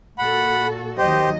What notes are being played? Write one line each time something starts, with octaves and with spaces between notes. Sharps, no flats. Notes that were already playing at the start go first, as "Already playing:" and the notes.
A#2 F#4 A4 F#5 B5
D#2 F#3 G4 C5 D#5